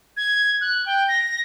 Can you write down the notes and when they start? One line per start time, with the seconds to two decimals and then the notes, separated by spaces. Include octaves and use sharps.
0.17 G#6
0.61 F#6
0.86 G5
1.08 A#6